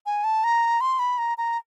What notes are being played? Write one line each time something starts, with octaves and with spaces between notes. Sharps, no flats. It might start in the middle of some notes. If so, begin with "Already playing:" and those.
G#5
A5
A#5
C6
B5
A#5
A#5